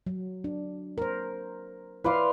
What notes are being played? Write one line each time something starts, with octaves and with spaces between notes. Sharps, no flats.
F#3
D4
A#4 C5
E4 B4 D5 F5 C6